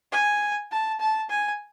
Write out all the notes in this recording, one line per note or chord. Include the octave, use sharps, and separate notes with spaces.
G#5
A5
A5
G#5